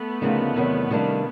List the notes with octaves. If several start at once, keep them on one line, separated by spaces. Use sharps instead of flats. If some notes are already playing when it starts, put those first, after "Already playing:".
Already playing: A3 B3
D2 C#3 F3 A#3 D#4
E2 C3 D#3 F#3
C3 D#3 G3 A#3 D4